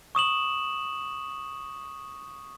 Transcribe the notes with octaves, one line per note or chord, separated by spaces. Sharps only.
C#6 D#6 E7 F#7